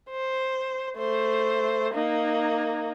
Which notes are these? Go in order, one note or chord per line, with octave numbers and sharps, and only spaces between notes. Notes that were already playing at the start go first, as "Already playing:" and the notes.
C5
A3 C5
A#3 D#4